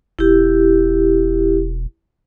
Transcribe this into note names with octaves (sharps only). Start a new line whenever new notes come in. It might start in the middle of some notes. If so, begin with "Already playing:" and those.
E1 E4 G4